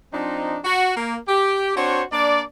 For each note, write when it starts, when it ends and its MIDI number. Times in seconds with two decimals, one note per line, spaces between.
0.14 0.59 53
0.14 0.59 60
0.14 0.59 62
0.14 0.59 63
0.65 0.95 66
0.97 1.17 58
1.28 1.75 67
1.77 2.03 60
1.77 2.03 62
1.77 2.03 66
1.77 2.03 72
1.77 2.03 73
2.12 2.42 58
2.12 2.42 62
2.12 2.42 74